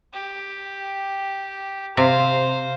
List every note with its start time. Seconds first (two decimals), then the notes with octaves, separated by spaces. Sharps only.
0.13 G4
1.97 C3 C5 F5